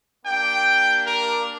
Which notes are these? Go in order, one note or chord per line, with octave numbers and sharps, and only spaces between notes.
A#3 D4 G4 G5
A#4